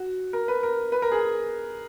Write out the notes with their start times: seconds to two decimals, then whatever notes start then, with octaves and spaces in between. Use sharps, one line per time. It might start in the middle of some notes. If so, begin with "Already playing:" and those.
Already playing: F#4
0.33 A#4
0.48 B4
0.63 A#4
0.92 B4
1.02 A#4
1.12 G#4